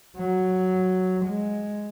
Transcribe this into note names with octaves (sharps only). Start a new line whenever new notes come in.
F#3
G#3